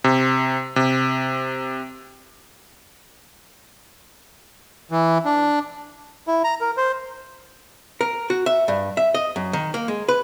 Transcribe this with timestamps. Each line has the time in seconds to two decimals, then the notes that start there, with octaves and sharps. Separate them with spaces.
0.04 C3
0.76 C3
4.91 E3
5.25 D4
6.27 E4
6.44 A#5
6.61 A#4
6.77 C5
8.01 A#4
8.30 F#4
8.46 E5
8.68 G2
8.97 E5
9.14 D#5
9.36 F#2
9.53 D#3
9.74 A#3
9.88 G#3
10.09 B4